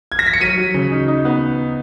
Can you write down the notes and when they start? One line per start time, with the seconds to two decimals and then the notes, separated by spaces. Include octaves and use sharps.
0.12 G#6
0.19 A#6
0.26 B6
0.33 C#7
0.41 F#3 B6 D#7
0.58 F#3
0.74 C#3
0.91 D#4
1.08 D#4
1.25 B3